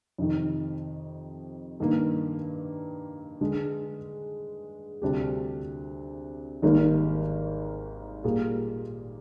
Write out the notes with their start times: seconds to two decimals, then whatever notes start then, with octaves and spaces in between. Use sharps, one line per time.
0.18 F2 C3 D#3
1.80 G2 D#3 A#3
3.41 D3 G#3 D4
5.02 D2 C3 G3 D4 G4
6.62 G#1 G#2 D#3 G3 A#3
8.24 A#2 G3 A#3 F4 G#4